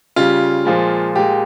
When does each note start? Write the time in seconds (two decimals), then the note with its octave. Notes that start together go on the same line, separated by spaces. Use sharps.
0.16 C#3 G3 F4
0.65 A#2 F3 G#3
1.15 A#2 G#3 G4